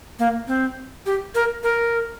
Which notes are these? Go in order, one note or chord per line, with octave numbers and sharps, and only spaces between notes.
A#3
C4
G4
A#4
A#4